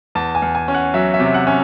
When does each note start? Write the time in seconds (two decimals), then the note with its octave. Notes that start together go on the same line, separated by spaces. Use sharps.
0.15 E2 A5
0.35 G#5
0.42 E2
0.55 G#5
0.68 C#4
0.74 F#5
0.94 F#3 E5
1.14 E5
1.20 C3
1.34 F#5
1.47 C#4